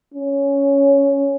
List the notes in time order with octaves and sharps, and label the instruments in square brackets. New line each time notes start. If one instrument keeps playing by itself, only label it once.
[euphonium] C#4